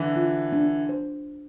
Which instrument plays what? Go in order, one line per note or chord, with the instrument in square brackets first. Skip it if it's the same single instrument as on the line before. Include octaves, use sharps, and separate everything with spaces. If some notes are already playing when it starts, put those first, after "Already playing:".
Already playing: [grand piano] D3 E3
[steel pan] F4
D4
C5